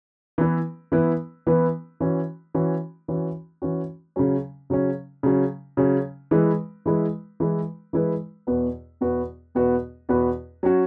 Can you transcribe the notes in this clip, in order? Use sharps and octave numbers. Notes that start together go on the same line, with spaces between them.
E3 B3 E4 B4
E3 B3 E4 B4
E3 B3 E4 B4
E3 C#4 F#4
E3 C#4 F#4
E3 C#4 F#4
E3 C#4 F#4
C#3 F#3 C#4
C#3 F#3 C#4
C#3 F#3 C#4
C#3 F#3 C#4
E3 G#3 E4 B4
E3 G#3 E4 B4
E3 G#3 E4 B4
E3 G#3 E4 B4
E2 B2 B3 F#4 B4
E2 B2 B3 F#4 B4
E2 B2 B3 F#4 B4
E2 B2 B3 F#4 B4
F#3 C#4 F#4